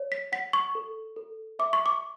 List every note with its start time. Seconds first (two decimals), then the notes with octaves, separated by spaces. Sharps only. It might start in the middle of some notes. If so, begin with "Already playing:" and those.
Already playing: C#5
0.12 B6
0.32 F#5 B6
0.53 C#6
0.75 A4
1.16 A4
1.59 E5 D6
1.73 C#6
1.86 D6